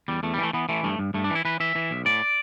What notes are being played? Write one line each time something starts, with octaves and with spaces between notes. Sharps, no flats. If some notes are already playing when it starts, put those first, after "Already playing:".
E2 G3
E2 A3
G3
E3 A3
E3 B3
E3 A3
G2 A3
G2
G2 A3
D4
E3
E4
E3 B4
E3 E5
E3
B1
A2 D5